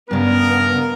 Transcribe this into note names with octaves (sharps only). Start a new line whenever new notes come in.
G2 C#3 B3 A#4